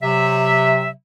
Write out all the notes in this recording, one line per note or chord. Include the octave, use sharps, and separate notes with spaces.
C3 F#3 E5